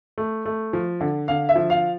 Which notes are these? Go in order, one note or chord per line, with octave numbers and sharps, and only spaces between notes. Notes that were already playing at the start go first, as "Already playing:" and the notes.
A3
A3
F3
D3
D3 F5
E5
F3
F5